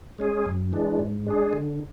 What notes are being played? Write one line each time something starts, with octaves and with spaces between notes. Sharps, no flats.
G#3 C#4 G#4
F#2
E3 G#3 D4
G#2
G#3 D4 G#4
D3